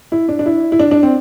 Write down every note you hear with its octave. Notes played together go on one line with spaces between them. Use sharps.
E4
D4
D4
E4
E4
D4
D4
C4